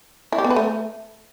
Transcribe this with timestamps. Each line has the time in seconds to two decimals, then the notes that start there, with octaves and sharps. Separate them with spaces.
0.32 E4
0.38 G4
0.44 B3
0.50 B4
0.56 A3